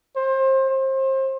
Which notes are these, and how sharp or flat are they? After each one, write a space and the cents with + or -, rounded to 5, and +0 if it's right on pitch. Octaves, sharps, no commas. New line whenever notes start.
C5 +30
C5 +30